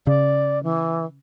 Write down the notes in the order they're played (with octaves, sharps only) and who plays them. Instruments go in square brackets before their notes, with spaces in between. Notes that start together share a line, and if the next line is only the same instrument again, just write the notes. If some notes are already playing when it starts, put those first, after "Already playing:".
[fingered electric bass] C#3 [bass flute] D5
[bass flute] E3